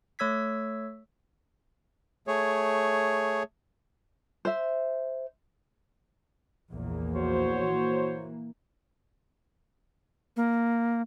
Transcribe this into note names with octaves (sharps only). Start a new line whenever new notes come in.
A3 C#5 E6 G#6 B6
A3 G#4 C#5
C5 E5
A#1 E2 A#3
F#4 C5 C#5
E3 A#3
A#3